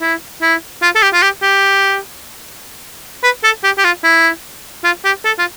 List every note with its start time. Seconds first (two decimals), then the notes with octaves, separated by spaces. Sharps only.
0.02 E4
0.42 E4
0.82 F4
0.95 A4
1.02 G4
1.14 F4
1.22 G4
1.42 G4
3.23 B4
3.44 A4
3.64 G4
3.78 G4
3.84 F4
4.04 E4
4.84 F4
5.05 G4
5.25 A4
5.39 F4